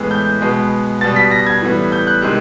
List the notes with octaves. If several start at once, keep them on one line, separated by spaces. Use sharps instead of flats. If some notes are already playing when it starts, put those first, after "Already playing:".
Already playing: A2 E3 G#3 B3
G6
B2 G#3 B3
B2 G3 B3 A6
B6
A#6
G#6
A2 E3 G3 B3
G6
F#6
C3 D#3 G#3 F#6